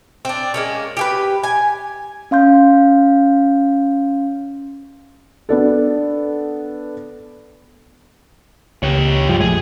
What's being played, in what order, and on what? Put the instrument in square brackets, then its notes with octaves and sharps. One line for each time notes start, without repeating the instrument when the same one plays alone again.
[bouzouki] C4 D4
G#3 A#3 C#4
G4 G#4 B4
G#5
[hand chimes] C#4 F5 C6 G6
[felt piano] B3 D4 A4
[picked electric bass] C#2 [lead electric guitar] G4 C#5
[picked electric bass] G2 F3 [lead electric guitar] G3 G#3
[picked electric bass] A#1 F2 A3 [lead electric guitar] G#4